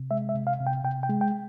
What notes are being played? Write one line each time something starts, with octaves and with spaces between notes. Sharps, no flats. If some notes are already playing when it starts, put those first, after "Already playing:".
Already playing: C3
G#3 E5
E5
C3
F5
C3
G5
C3 G5
G5
G#3
G5